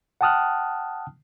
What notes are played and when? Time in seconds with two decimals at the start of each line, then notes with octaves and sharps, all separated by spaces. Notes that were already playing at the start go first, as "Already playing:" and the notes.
0.21 F#5 G5 A5 D#6 F6 F#6